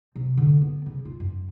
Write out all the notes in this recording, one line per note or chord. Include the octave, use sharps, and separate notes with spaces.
C3
D3
B3
C#3
F4
F#2